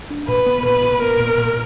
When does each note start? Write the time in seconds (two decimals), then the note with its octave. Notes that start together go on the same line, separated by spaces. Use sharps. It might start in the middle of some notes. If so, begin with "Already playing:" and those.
0.10 D4
0.28 A#2 B4
0.46 B3
0.65 A#2 B4
0.83 A#2
1.02 B3 A#4
1.20 A#2
1.38 A#2